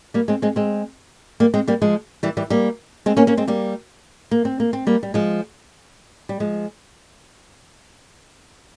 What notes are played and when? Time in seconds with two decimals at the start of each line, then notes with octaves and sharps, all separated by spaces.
0.14 G3 A#3
0.28 G#3 C4
0.42 G#3 C4
0.56 G#3 C4
1.40 G3 A#3
1.54 G#3 C4
1.68 G3 A#3
1.82 F3 G#3
2.23 E3 G3
2.37 E3 G3
2.50 G3 A#3
3.06 G#3 C4
3.17 A#3 C#4
3.27 A#3 C#4
3.37 G#3 C4
3.48 G3 A#3
4.31 A#3
4.45 C4
4.60 A#3
4.73 C4
4.87 G3 A#3
5.03 G3
5.14 F3 G#3
6.29 G3
6.40 F3 G#3